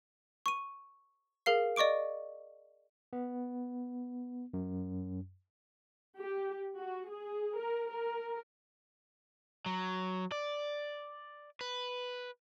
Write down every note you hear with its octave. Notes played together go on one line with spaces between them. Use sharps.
C#6 D#7
G#4 A#4 F5 C7
D5 D#5 C#6 D6 D7
B3
F#2
G4
F#4
G#4
A#4
A#4
F#3
D5
B4